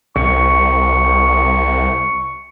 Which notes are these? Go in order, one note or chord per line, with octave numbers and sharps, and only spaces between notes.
C2 C#6